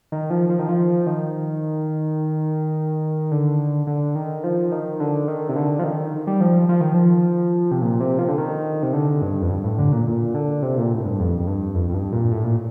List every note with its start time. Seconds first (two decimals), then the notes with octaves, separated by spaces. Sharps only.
0.12 D#3
0.30 F3
0.49 F3
0.59 D#3
0.69 F3
1.07 D#3
3.31 D3
3.87 D3
4.16 D#3
4.44 F3
4.72 D#3
5.00 D3
5.28 D#3
5.49 C3
5.56 D3
5.79 F3
5.84 D#3
6.27 G3
6.41 F3
6.69 F3
6.81 D#3
6.94 F3
7.71 C3
7.82 A#2
8.01 C3
8.19 F3
8.28 D3
8.38 D#3
8.83 C3
8.93 D3
9.22 G2
9.42 F2
9.50 G2
9.64 A2
9.79 D3
9.92 A#2
10.07 A#2
10.34 D3
10.62 C3
10.77 A#2
10.94 A2
11.05 G2
11.20 F2
11.40 F2
11.47 G2
11.75 F2
11.89 F2
11.94 G2
12.12 A#2
12.31 A2
12.44 A#2